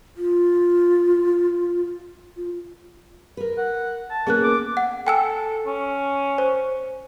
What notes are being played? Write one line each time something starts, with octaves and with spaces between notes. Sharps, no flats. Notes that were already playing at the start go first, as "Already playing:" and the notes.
F4
F4
A#4 B4
F#5
A5
A#3 B3 C#4 G#4 F#6
D6
F#5
A4 G5 G#5 E6
C#4
C5